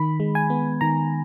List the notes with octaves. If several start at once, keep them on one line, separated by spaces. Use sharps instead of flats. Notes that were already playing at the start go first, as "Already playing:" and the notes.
Already playing: D#3 B5
G#3
G#5
B3
D#3 A#5